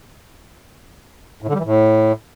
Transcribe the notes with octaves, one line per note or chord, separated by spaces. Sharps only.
A2
D3
G3
E3
A2